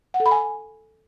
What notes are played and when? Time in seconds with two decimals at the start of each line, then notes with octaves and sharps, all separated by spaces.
0.14 F#5
0.20 A4
0.26 B5
0.31 G#5